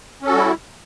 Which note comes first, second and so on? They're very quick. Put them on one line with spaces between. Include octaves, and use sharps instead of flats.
C#4 A4 F#4 G3 E4